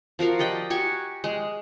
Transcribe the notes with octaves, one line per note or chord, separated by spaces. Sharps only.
F3 F#4 A#4 F5
G4 D5 D#5 G5
F#4 G4 G#5 C#6
G#3